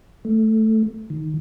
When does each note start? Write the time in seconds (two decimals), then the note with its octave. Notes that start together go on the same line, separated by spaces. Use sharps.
0.25 A3
1.10 D#3